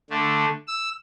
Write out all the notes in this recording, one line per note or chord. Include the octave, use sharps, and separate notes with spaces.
D3 A3
E6